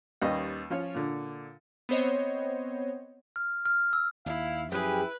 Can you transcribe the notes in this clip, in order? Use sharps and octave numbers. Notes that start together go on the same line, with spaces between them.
D#2 G3 C#4 B4 D#5
F3 C#4 F4 C#5
A#2 D3
B3 C4 C5 C#5 D#5
F6
F6
E6
D#2 E4 F5
F#2 F3 E4 G4 G#4 B4